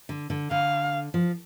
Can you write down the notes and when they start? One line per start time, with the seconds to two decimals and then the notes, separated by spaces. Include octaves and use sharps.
0.09 D3
0.30 D3
0.51 D3 F5
1.14 F3